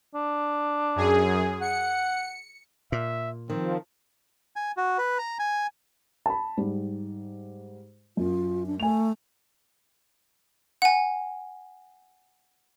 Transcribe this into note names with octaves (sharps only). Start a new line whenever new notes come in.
D4
F#2 G#4
F#5 C#7
A#2 E5
D#3 F3 C4
G#5
F#4
B4
A#5
G#5
A5 B5
G#2 G3
F#2 F4
D4
A3 G#5 F7
F#5 G#5